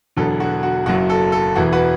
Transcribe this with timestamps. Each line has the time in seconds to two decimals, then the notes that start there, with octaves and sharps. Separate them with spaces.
0.17 E1 E2 D3 F#3 A4
0.40 F#4
0.63 F#4
0.86 F#1 F#2 F#3 F#4
1.10 A4
1.32 A4
1.55 E1 E2 E3 F#4
1.72 F#4 B4